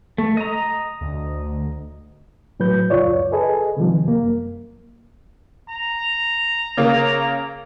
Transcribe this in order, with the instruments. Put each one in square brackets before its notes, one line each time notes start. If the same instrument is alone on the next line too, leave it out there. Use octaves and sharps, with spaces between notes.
[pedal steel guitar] A3
D#5 A#5
[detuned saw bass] D2
[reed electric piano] A2 F#3 B4 G6
C#2 F#2 F4 C#5 D5
G#4 A4 B4 D#5 G#5
C3 D#3 F3 G3
F#2 A#3
[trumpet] A#5
[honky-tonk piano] C#3 A#3 C#4